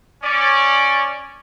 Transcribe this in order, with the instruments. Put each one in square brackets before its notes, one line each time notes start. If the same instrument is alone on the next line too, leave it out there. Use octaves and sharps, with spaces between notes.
[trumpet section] C#4 D5